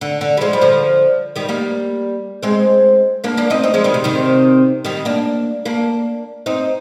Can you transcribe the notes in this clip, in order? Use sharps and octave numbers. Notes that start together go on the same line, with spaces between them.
D3
D3
G3
F3 G#3
G3
D3 F3
D#3 G3
G3 A#3
G#3 C4
A#3 D4
A#3 D4
C4 D#4
C4 D#4
F3 G#3
D#3 G3
C3
C3 D#3
D#3 G3
A#3 D4
A#3 D4
C4 D#4